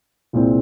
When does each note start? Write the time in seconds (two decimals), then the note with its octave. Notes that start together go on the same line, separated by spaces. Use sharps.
0.33 C2 A#2 G#3 C4